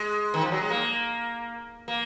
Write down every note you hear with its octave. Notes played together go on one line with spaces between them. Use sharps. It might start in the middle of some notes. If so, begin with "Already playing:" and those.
Already playing: G#3
D#3
F3
F#3
G#3
A#3
A#3